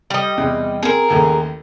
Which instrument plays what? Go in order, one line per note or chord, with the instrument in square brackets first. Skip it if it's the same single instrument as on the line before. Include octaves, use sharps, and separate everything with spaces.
[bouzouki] G3 D#5
[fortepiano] E2 C3
[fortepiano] C4 [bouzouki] G#4 A#4
[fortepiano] A1 D#2 A4